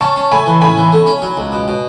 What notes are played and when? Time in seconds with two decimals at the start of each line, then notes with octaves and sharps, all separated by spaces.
0.01 C#4 A5 C#6
0.16 C#4
0.31 A3 G#5 B5
0.46 E3
0.61 A2 G#5 B5
0.77 E3
0.92 A3
1.06 C#4
1.22 F#3
1.37 C#2
1.52 B2
1.68 B2